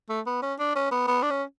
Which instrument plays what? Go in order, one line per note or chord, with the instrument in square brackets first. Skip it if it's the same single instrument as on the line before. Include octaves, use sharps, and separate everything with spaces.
[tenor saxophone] A3
B3
C#4
D4
C#4
B3
B3
D4
C#4